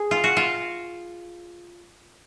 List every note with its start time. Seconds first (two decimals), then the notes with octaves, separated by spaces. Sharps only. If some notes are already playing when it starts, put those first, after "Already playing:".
Already playing: G#4
0.11 F4
0.24 F#4
0.37 F4